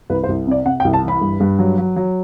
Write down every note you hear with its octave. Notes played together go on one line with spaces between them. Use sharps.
C2 B4
C5
C2
C3 D5
C3 F#5
G5
C2
A5
E3
B5
G2
G2
F#3
F#3
F#3